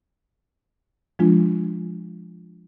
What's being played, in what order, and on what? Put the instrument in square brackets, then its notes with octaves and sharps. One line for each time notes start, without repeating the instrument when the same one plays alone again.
[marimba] F3 G#3 D4 F4